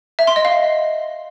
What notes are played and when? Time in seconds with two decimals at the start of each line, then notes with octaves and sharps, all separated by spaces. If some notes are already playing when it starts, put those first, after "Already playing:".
0.19 E5
0.27 C6
0.36 D#5
0.45 F5